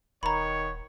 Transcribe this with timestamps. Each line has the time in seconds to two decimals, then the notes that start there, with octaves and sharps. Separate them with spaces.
0.23 D#1 D#3 B3 C#5 A#5 B5